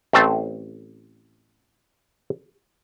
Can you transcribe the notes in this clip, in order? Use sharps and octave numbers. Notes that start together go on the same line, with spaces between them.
A1 A3 C4 A5